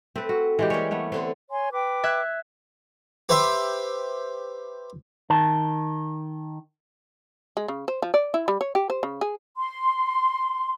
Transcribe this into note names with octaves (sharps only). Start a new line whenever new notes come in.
A3 C4 B4
F#4
E3 G#3 G4
G3 A#3 C#5
A3 B3 C#5
D3 B3 C4
C#5 G#5 C6
B4 G5 D6
E5 F#6 G#6
G4 B4 C5 E5
D#3 A5
G#3
C#3
C5
F3
D5
E4
G3
C#5
G4
C5
C#3
G#4
C6